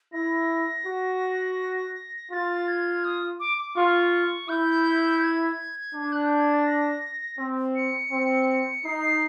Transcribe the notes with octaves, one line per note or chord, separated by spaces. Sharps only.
E4 A#6
F#4
F4 A6
G#6
D#6
D6
D6
F4 C#6
E4 G6
G#6
D4
F#6
G6
G#6
A6
A#6
C4
C#7
C4
D#4 C7